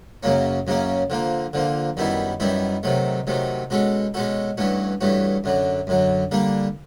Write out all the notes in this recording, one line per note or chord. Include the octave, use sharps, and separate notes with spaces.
F#2 C#3 F#3 A#3 C#4
F#2 C#3 F#3 A#3 C#4
D3 F3 A#3
D3 F3 A#3
F#2 D#3 G3 B3 E4
F#2 D#3 G3 B3 E4
C3 D#3 F#3 A3
C3 D#3 F#3 A3
B2 G#3 C#4 F#4 A4
B2 G#3 C#4 F#4 A4
G2 E3 A3 C#4 F#4
G2 E3 A3 C#4 F#4
F#2 D3 F#3
F#2 D3 F#3
D3 G3 A#3 D4